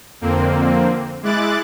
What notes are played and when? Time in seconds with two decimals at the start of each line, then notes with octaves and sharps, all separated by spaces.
0.21 F2 D3 A#3 C4
1.23 G#3 E4 D6 F#6 A6